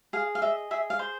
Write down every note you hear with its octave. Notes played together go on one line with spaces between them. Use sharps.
G#4 F5
F5
D#5 E5
G#4 E5
F5
C5